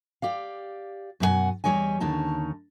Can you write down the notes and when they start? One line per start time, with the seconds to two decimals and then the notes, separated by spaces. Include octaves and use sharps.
0.22 G4 D5 F5
1.20 F#2 B2 D4 E4 F#5 G#5
1.64 E2 F3 G3 C#5 D#5 G#5
2.00 D#2 D3 C#4 D#4 A5